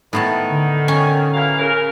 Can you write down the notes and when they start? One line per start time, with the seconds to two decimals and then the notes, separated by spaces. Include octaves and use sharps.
0.13 A2 D#3 B3 A5
0.48 D3
0.88 C#4
1.34 E3 F#3 F5
1.59 C#3 A#4